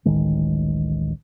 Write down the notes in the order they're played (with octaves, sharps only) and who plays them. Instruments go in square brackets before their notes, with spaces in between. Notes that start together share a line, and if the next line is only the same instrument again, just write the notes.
[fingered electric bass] D1 A1 D#3 G#3